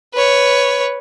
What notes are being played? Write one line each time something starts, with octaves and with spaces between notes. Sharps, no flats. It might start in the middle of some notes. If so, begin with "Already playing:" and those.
B4 C#5